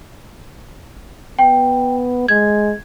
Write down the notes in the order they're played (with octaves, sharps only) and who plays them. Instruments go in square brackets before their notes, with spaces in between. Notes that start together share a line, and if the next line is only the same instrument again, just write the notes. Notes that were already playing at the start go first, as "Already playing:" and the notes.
[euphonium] B3 [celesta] G5
[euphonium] G#3 [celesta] G#6